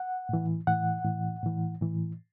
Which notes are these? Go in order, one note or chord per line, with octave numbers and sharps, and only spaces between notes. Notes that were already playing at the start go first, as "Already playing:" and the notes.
Already playing: F#5
A2 E3
A2 E3 F#5
A2 E3
A2 E3
A2 E3